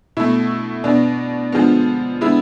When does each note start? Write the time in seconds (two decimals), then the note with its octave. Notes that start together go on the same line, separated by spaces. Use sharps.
0.17 B2 A3 E4
0.84 B2 B3 D4
1.52 D3 F3 G#3 B3
2.21 D3 G#3 B3 E4